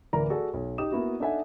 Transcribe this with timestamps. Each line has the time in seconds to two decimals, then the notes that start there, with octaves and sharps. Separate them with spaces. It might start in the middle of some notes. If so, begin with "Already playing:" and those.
0.13 D1 E3 A#4 D5 A#5
0.30 F#4 G#4 A4 D5
0.54 B1
0.78 D#4 G4 D#6 E7
0.92 A#3 B3 E4 F#4
1.20 D4 D#4 A4 E5 F#5 G#5